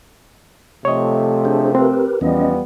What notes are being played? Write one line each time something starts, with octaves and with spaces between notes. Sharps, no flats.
C3 F3 A3 C#5 D#5
D4 G#4 C5
C4 G4 A#4 B4
E2 F3 G3 B3 C#4 D#5